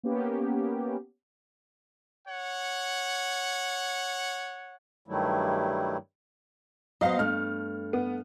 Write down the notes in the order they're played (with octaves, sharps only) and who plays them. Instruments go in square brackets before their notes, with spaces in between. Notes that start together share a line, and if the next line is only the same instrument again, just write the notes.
[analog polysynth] A#3 B3 C#4 G4
[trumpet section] C#5 F#5
[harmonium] G2 D#3 F#3 G3 A3 E4
[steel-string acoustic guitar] F#3 B3 C5 [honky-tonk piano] D#5 F5
[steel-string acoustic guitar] G2 A3 [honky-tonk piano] F6
[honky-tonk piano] B3